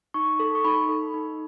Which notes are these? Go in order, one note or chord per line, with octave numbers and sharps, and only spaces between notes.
D#4 C#6
A4
C#6
D#4 B5
A4
D#4